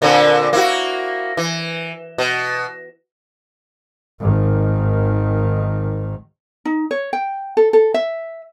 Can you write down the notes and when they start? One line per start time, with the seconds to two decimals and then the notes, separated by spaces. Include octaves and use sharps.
0.02 A#2 D3 C4
0.53 A#3 E4 F#4
1.37 E3
2.18 B2
4.20 G#1 D#3
6.65 D#4
6.91 C#5
7.13 G5
7.57 A4
7.73 A4
7.94 E5